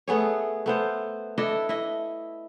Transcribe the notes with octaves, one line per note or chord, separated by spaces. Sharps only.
A3 B3 G#4 C#5
A3 B3 C5
D4 E4 A4 D#5
E4 D#5